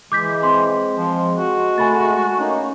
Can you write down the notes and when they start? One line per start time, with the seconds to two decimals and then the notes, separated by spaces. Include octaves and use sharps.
0.12 E3 G#3 D6 G6 B6
0.43 C4 C6
0.95 F3
1.35 F#4
1.78 A3 G#5 B5 A6
2.39 A#3 C#4 D#4